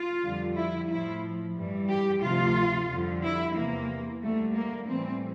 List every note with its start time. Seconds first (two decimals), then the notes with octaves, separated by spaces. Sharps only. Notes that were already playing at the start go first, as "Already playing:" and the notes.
Already playing: F4
0.23 F2 D3 G3
0.56 E4
0.89 A2 F3 E4
1.56 G2 E3 G3
1.88 G4
2.22 D2 C3 F3 F4
2.88 F2 D3 G3
3.22 E4
3.55 E2 C3 E3 A#3
4.21 D2 D3 G3 A3
4.55 A#3
4.88 A2 E3 G3 C4